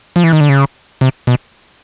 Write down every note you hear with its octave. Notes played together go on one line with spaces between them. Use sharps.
F3
E3
D#3
D3
C#3
C3
B2